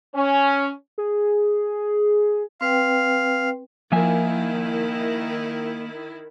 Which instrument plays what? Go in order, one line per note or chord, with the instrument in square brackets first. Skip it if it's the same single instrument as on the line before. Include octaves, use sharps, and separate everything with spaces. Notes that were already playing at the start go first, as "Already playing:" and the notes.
[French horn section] C#4
[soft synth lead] G#4
[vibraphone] C4 B4 G5 [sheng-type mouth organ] F5
[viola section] D#3 E4 [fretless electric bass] F3 [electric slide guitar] A#3 E5 G#5